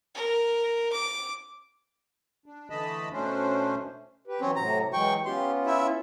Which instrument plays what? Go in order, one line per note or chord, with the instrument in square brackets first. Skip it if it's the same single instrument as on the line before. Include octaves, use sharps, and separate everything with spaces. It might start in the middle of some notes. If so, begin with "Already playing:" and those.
[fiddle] A#4
D6
[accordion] D4
D3 E3 A3 D#5 A5 B5
B2 A3 C#4 D4 C5
[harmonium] G4 B4
[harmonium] E3 F#3 [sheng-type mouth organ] C4 C#4
[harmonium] A2 C3 F#3 [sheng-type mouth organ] A#5
[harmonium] E3 F#3 G#3 [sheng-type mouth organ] G5 C#6
[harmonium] B3 C#4 F4 [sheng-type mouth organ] G4 C6
[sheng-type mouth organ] E4 E5